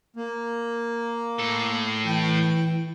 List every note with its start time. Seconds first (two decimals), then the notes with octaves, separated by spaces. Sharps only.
0.16 A#3
1.39 A2 A4
2.05 E3 G5